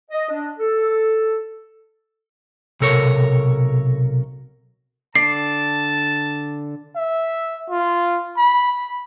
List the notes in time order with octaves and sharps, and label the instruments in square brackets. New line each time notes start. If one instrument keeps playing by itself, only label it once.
[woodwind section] D#5
D4
A4
[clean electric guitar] B1 C3 A4 A#4 C#5
[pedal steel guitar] D3 D5 [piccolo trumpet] A5 [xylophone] C7
[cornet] E5
F4
B5